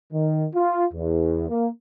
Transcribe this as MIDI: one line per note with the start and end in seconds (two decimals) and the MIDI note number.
0.13 0.46 51
0.55 0.85 65
0.94 1.49 40
1.49 1.68 58